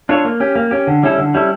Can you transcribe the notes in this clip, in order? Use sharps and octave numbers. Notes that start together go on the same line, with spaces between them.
D4 F4 A4 C#5
A#3
C#4 G4
A#3
C#4 G4
D3
G3 C#4 E4 A4
D3
G3 C#4 E4 A4